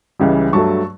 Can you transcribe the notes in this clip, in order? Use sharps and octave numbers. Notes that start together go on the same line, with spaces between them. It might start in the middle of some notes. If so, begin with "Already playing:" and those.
C#2 C#3 E3 G3
G2 F#3 A3 A5 C#6